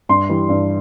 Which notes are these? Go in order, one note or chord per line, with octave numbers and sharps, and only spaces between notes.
G2 C6
E3 G3
G2